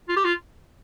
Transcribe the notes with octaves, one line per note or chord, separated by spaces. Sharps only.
F4
G4
F4